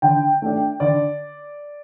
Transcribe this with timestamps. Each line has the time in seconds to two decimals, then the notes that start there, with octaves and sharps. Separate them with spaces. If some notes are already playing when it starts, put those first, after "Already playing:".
0.02 D3 G5
0.42 A3 D4
0.80 D3 D5